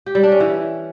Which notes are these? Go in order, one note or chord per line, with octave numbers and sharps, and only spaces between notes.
G4
G3
D4
C#4
E3